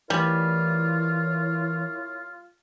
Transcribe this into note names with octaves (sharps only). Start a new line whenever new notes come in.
E3 G3 A3 E4 F4 A#4 C#5